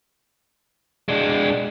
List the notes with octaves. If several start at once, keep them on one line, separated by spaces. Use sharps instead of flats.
G#3 D4